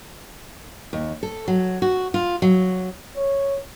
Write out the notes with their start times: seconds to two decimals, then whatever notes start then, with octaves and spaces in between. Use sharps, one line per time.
0.93 D#2
1.23 A4
1.48 F#3
1.82 F#4
2.14 F4
2.42 F#3
3.17 C#5